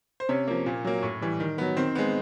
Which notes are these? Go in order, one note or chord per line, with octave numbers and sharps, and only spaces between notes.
C5
C3 C#4 C#5
F3 A#3
A#2
F#3 A#3
A2
E3 G3
D#3
F#3 B3
D#3 C4 C5
G#3 B3